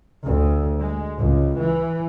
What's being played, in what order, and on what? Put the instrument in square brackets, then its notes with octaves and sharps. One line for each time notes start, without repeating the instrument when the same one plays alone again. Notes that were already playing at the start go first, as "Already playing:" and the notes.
[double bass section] D2
G#3
C#2
E3